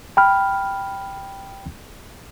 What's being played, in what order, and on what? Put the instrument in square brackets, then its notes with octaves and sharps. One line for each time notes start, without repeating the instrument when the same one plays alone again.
[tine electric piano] G5 B5 F6